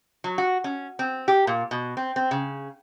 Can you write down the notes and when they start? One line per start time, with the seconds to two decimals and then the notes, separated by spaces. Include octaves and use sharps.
0.24 F#3
0.38 F#4
0.64 C#4
0.99 C4
1.28 G4
1.47 A#2
1.71 B2
1.97 C4
2.16 C4
2.31 C#3